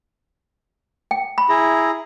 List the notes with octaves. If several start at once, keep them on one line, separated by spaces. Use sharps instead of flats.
G5
B5
E4 G#4 A#5